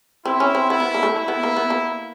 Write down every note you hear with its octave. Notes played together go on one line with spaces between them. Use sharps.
C4 E4
C#4
C4
B3 E4
B3
A#3
A3
E4
B3
A#3
B3
A#3